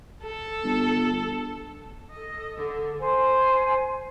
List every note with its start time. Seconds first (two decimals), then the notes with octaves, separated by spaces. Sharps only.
0.24 A4
0.64 G1
2.11 A4 D#5
2.56 D3 A4
3.00 C5 G#5